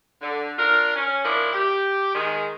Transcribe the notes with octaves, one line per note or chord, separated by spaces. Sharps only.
D3
D4 F4 A#4
C#4
F3 A#3 D4 E4
G4
D#3 G#3